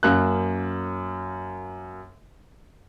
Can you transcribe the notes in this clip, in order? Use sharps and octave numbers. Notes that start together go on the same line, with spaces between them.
F#2 A#3 F#6